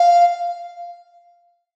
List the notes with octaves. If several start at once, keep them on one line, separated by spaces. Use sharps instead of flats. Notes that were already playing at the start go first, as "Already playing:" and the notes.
Already playing: F5